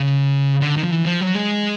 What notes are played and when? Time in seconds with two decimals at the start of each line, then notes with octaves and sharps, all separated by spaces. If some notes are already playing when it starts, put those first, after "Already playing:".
Already playing: C#3
0.61 D3
0.76 D#3
0.84 F3
0.91 E3
1.06 F3
1.21 F#3
1.35 G#3